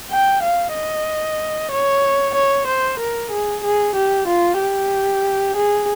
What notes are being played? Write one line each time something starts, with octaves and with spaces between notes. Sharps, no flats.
G5
F5
D#5
C#5
C#5
C5
A#4
G#4
G#4
G4
F4
G4
G#4